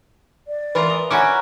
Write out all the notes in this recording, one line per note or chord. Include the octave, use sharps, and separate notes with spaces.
D5
E3 F4 A#4 B4
D#5
C#4 E4 F#4 G#5 A#5 D6